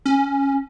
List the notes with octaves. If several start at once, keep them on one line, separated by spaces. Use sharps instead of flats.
C#4